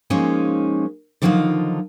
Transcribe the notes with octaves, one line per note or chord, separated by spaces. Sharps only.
F3 G#3 A#3 C#4 D#4
D3 D#3 F3 F#3 D#4 F4